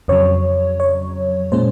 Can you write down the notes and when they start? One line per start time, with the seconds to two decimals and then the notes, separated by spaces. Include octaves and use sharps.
0.08 F2 C#3 F#3 C#5
0.80 C#5
1.52 A#2 G#3 C#4 C5